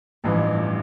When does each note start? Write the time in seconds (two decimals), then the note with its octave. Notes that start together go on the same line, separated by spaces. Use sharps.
0.24 A1 G2 E3 F3